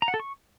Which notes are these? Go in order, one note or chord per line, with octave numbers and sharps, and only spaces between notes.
A#5
F#5
A4
C#6